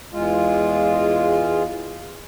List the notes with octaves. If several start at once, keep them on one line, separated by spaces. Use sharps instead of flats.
E2 G#3 F4